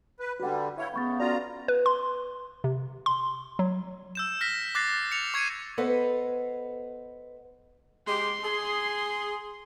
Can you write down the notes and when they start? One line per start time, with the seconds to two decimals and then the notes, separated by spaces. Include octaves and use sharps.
0.20 B4
0.40 D3 G3 F#4 B4 D5 F#5
0.78 E4 C#5 E5 F5 G6
0.94 C#3 B3 B5 C#6 A6
1.20 C#4 F4 F#4 A4 D5 A#5
1.68 B4
1.86 C6
2.64 C3
3.06 C6
3.59 F#3
4.15 E6 G6 E7
4.41 F6 A#6 B6
4.75 D6 F#6 A6 A#6 C7
5.12 C#7 F7
5.34 C#6 G#6 C7 C#7 D#7
5.78 B3 A4 B4 C5 D#5
8.07 G#3 G4 C6
8.43 G#4